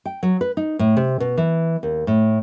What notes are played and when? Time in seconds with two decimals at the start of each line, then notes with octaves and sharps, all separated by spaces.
0.05 G5
0.23 F#3
0.41 B4
0.57 D#4
0.79 A2
0.97 C3
1.20 B2
1.37 E3
1.83 D#2
2.07 A2